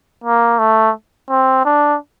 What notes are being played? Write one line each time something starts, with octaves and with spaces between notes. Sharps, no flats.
A#3
A3
C4
D4